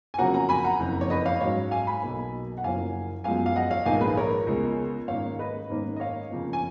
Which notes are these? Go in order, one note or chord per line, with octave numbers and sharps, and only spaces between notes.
G#5
F2 C#3 F#3 A#3 C#4 F#5 A#5
F#5 A#5
G#5 B5
F#5 A#5
F#1 F2 F3
C#5
B4 D#5
C#5 F5
G#2 F#3 C#4 C#5 F5
F5 G#5
G#5 B5
B1 B2 A#3
F#5
F#1 F#2 F3 A#3 C#4 F5 G#5
F#2 F3 G#3 B3 F5 G#5
F5
D#5 F#5
C#5 F5
A#1 G#2 D#3 A#3 F5 G#5
G#4 B4
A#4 C#5
C#2 C#3 G#3 B3
G#2 D#3 A#3 C#4 C#5 F5
B4 D#5
G#2 D#3 A#3 C#4
D#5
C#5 F5
F2 C#3 F3 A#3
G#5